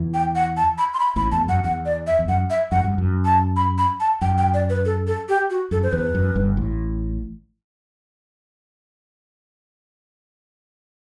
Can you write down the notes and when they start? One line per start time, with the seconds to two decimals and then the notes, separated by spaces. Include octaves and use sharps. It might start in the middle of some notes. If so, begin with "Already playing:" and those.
Already playing: E2 E3
0.14 G5
0.35 F#5
0.57 A5
0.78 B5
0.94 C6
1.00 B5
1.16 A1 A2 B5
1.32 E2 A5
1.48 F#2 F#5
1.64 E2 F#5
1.85 D5
2.07 E5
2.19 E2
2.28 F#2 F#5
2.50 E5
2.71 F#2 F#5
2.84 G2
2.98 F#2
3.25 A5
3.56 B5
3.78 B5
4.00 A5
4.21 F#2 G5
4.38 G5
4.54 D5
4.70 B4
4.85 A4
5.07 A4
5.29 G4
5.50 F#4
5.71 F#2 A4
5.83 C5
5.93 E2 B4
6.15 F#2
6.36 G1 G2
6.57 A1 A2